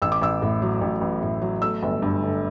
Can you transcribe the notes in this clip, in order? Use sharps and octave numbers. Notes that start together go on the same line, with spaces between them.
A1 E6
D6
A1 E6
A2
F#3
A1
A1
A2
F#3
A3 E6
G1
G2
D3